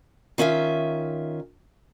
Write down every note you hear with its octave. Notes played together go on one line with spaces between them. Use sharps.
D#3 C#4 F4 E5